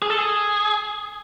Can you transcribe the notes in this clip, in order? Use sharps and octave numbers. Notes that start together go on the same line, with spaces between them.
G#4
A4
G#4